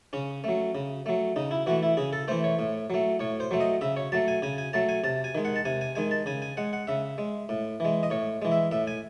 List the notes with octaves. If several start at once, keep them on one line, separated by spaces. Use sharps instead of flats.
C#3 C#4
F#3 A3
C#3
F#3 A3
C#3 D#4
E4
E3 A3 F#4
E4
C#3 G#4
A4
E3 A3 C5
C#5
A2
F#3 A3
A2 C#5
C5
F#3 A3
D#5
C#3 E5
C#5
F#3 A3 A5
G#5
C#3 G#5
G#5
F#3 A3 A5
G#5
C3 A5
G#5
D#3 G#3
F#5
A5
C3 G#5
G#5
D#3 G#3 G#5
A5
C#3 G#5
G#5
G#3 F#5
F#5
C#3 E5
G#3
A2
E3 G#3
D#5
A2 C#5
E3 G#3
E5
A2 E5
G#5